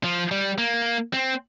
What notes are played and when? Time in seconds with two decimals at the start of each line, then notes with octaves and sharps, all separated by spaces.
0.04 F3
0.31 G3
0.58 A#3
1.13 C4